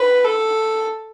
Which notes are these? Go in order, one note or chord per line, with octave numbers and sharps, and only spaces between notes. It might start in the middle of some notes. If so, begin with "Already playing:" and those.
Already playing: B4
A4